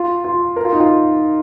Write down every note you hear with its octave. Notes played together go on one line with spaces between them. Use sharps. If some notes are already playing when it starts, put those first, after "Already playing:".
Already playing: F4
F4
A#4
F4
D#4
F4